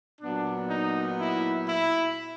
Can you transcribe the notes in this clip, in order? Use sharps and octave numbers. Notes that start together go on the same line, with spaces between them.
A#2 F#3 B3 D4
D#4
E4
E4